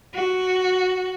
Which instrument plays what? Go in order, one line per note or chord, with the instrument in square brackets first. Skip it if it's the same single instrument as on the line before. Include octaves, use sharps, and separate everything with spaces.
[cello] F#4